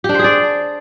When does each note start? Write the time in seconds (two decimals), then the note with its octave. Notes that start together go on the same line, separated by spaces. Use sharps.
0.04 G4
0.09 D4
0.14 C5
0.19 G#4
0.24 D5